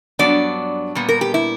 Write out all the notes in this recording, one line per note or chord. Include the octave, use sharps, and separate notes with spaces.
G2 F#3 B3 D4 D5
A#2 G3 B3
A#4
G4
E4